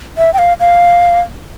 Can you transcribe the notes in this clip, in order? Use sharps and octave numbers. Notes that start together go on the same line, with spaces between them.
E5
G5
F5
F5